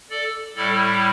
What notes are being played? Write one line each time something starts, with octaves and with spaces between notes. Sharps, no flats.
A4 D5
A2 G3 E4 A4 D5